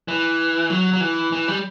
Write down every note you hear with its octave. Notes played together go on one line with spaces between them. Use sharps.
E3
F#3
F#3
E3
E3
G3